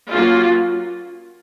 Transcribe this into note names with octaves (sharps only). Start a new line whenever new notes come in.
F#3 A#3 C#4 F4